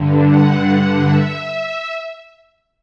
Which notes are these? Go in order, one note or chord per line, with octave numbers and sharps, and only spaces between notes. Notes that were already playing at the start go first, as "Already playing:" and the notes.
Already playing: G2 D3
F#5
E5